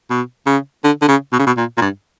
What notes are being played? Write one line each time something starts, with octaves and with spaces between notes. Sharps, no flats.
B2
C#3
D3
D3
C#3
B2
C#3
B2
A#2
A#2
G2